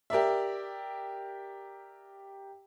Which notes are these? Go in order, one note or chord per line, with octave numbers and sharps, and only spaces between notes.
G4 A#4 D5 E5